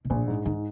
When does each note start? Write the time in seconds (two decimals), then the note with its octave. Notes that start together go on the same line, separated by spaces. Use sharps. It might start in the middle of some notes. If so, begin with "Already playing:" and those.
0.05 B2
0.10 A#1 A#2
0.28 G#2
0.45 G#2 D#3